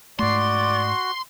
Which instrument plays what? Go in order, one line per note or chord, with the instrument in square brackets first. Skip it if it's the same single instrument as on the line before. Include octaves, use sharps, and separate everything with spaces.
[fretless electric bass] G#2 A3 [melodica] F#4 [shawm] D5 [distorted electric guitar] C6